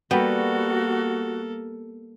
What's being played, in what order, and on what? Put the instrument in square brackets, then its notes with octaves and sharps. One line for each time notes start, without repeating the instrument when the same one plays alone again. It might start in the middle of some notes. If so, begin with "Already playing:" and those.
[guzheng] G3 [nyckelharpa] A#3 A4 [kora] B3 [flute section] F#4